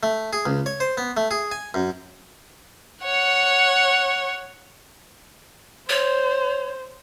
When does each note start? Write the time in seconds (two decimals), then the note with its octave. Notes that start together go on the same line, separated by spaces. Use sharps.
0.03 A3
0.33 G#4
0.46 C#2
0.66 C#5
0.80 C5
0.97 B3
1.17 A3
1.31 G#4
1.52 G#5
1.74 F#2
3.03 C#5 F#5
5.89 C5 C#5